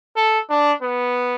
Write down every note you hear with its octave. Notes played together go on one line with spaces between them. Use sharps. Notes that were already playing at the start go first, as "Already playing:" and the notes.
A4
D4
B3